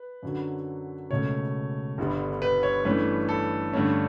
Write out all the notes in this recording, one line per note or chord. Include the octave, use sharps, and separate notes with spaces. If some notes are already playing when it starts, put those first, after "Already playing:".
Already playing: B4
F#2 D3 F#3
C#2 B2 A3 C#4 C#5
G1 G2 D3 G3 B3
B4
C#5
G2 E3 A3 C#4 B4
A4
G2 D3 A3 C#4